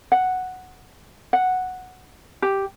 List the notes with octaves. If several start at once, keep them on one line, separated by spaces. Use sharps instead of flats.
F#5
F#5
G4